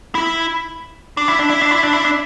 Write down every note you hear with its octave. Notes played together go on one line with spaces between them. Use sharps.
E4
D4
E4
D4
E4
D4
E4
D4
E4
D4